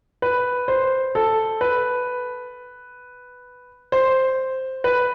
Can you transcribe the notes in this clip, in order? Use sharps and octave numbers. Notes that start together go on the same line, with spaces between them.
B4
C5
A4
B4
C5
B4